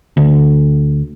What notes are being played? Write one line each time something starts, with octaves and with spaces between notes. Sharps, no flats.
D2